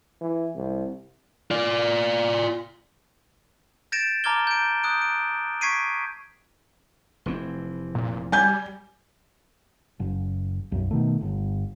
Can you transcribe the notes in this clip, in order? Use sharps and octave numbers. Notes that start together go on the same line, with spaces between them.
E3
C2
F4 D5
G6 A6 A#6 D7 E7
A5 A#5 D6 F6 G#6 G7
G6 D7
D#6 F#6 G6 D7
D7
C#6 G#6 B6 C7 D7 D#7
F1 E3 C4
A#2
G3 G#5 G6
F#1
B1 F#2
B2 D#3 A3
G1